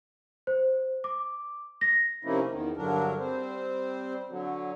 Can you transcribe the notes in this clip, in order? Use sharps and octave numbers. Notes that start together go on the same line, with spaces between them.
C5
D6
A#6
C3 F3 A#3 C#4 D#4 E4
E2 D#3
G2 D3 F#3 D4 A#4
G3 C4 C5
D3 F#3